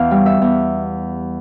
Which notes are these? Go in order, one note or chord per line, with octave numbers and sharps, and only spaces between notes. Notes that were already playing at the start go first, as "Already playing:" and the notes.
Already playing: E2 F5
G3
E5
E2